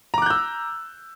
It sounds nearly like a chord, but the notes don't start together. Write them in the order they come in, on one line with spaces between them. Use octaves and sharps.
A#5 D6 F#6 G6 E6